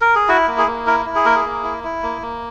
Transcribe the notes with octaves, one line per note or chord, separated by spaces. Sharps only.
A#4
G#4
E4 F#4
A#3
G#4
A#3
E4 A#4
E4
G#4
A#3 A#4
G#4
A#3
E4
E4
A#3
A#3